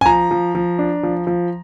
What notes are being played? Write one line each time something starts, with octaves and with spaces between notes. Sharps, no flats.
G#5
F3 A#5
F3
F3
D4
F3
F3